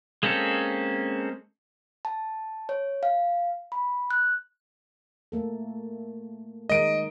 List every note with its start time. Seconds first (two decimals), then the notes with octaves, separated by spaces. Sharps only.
0.23 G#3 A#3 C4 C#4 A4
2.05 A5
2.69 C#5
3.03 F5
3.72 B5
4.11 F#6
5.32 A3 A#3 A4
6.69 D#3 G#3 A#4 D#5 D7